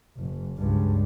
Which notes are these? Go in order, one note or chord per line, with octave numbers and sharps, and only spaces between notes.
F#1
C#2 G2